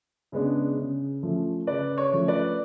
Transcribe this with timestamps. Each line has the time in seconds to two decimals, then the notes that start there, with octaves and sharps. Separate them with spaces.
0.32 C#3 G#3 B3 D4
0.77 C#3
1.23 F3 A3 C#4
1.67 C#3 B4 D5
1.98 C#5
2.13 F3 A3 C#4
2.28 B4 D5